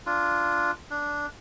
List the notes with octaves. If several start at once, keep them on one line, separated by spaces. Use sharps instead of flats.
D4 F4
D4